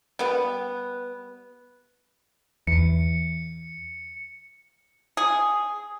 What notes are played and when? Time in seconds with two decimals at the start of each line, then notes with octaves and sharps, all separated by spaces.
0.19 G3 B3
2.67 E2 C#7
5.17 G#4